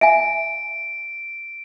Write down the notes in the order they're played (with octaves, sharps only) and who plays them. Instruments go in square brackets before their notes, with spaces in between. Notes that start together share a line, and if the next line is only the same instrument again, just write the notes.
[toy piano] E5 F5 G#5 [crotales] D7